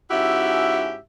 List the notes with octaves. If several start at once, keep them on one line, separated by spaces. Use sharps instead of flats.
G#2 C#4 E4 F#4 G4 E5